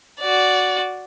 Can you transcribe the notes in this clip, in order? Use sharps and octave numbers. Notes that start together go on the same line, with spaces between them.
F#4 D5